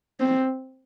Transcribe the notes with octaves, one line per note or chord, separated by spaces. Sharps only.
C4